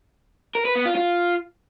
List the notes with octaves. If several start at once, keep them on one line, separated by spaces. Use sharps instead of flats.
A#4
B4
B3
F4
F4